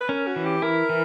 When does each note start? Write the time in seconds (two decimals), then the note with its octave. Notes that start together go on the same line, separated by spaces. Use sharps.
0.01 B4
0.09 C#4 A#4
0.27 F#4
0.36 E3
0.45 G4
0.62 E4 A#4
0.89 E3